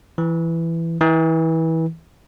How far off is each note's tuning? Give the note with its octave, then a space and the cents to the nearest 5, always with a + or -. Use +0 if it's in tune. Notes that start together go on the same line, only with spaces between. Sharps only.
E3 +10
E3 -25